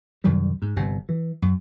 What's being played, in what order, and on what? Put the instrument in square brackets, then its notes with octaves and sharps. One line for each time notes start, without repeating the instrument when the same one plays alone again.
[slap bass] C2 F#2 D#3 G3
G#2
G1 C3
E3
F#2